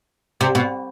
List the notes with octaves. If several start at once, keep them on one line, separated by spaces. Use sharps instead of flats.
C3
B2